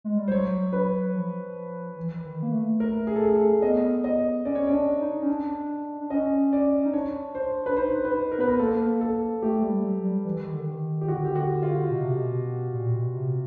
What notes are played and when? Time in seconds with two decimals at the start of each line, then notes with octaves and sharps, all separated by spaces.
0.04 G#3
0.18 G3
0.28 C5
0.31 F#3 C#5
0.73 B4
1.15 F3
1.97 E3
2.25 D#3
2.43 A#3
2.52 A3
2.80 A#4
3.07 G#4
3.16 A4
3.24 G#4
3.35 A4
3.62 B3 D#5
4.04 D#5
4.45 C#4 D5
4.55 C#5
4.67 C#4 D5
4.73 D4
5.01 D#4
5.22 C#4
5.29 D4
6.01 D4
6.10 C#4 D#5
6.53 D5
6.86 D#4
6.93 D4 C#5
7.35 C5
7.66 B4
7.77 D#4 C5
7.97 D#4
8.05 B4
8.18 D#4
8.32 A#4
8.38 B3 B4
8.48 A#4
8.59 A#3 A4
9.01 A4
9.42 A3 G4
9.62 G3
9.84 F#3
10.04 G3
10.25 E3
10.39 D#3
10.53 D3
10.67 D#3
11.01 G4
11.08 D3 F#4
11.25 G4
11.35 F#4
11.63 F4
11.90 B2
12.02 C3
12.13 B2
12.73 A#2
12.94 B2
13.15 C3